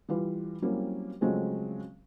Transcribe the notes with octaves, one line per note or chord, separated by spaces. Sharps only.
E3 G3 F4 B4
F#3 G3 A#3 C4 C#4 E4
C#3 F3 F#3 G#3 A3 C4